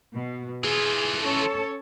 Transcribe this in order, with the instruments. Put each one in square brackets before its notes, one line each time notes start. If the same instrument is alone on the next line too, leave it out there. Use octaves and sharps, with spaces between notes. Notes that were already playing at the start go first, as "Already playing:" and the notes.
[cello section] B2
[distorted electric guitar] E3 F4 [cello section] G#4
[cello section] C#4 A4 C#5